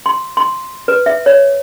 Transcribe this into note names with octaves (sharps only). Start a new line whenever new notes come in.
C6
C6
B4
E5
C#5